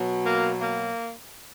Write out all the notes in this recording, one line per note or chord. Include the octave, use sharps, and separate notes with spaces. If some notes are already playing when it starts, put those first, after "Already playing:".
Already playing: B2 F#3
A#3
A#3